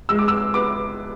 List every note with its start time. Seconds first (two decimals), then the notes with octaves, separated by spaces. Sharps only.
0.09 G#3 E6
0.19 D6
0.28 E6
0.53 B3 D6